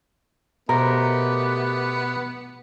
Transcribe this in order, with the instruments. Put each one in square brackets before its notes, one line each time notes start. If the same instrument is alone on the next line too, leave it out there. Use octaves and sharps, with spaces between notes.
[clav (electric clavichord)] B2 C5 [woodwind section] A3 G4 [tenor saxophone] B3 [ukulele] A#4